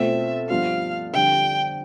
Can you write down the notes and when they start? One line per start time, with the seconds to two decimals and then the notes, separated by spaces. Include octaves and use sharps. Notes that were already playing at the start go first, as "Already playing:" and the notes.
Already playing: B2 A3 C4 F4 C5 E5
0.49 G2 F3 B3 F4 F5
1.13 F2 D3 G3 D4 G5